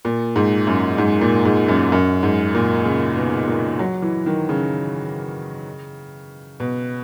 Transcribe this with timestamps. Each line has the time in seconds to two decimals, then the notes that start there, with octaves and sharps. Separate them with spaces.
0.05 A#2
0.36 G#2
0.67 F#2
0.98 G#2
1.21 A#2
1.45 G#2
1.68 F#2
1.92 F#2
2.23 G#2
2.55 A#2
2.85 C#3
3.17 B2
3.48 A#2
3.79 F#3
4.02 E3
4.26 D#3
4.49 C#3
6.60 B2